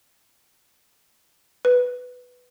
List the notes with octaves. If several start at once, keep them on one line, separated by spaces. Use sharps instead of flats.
B4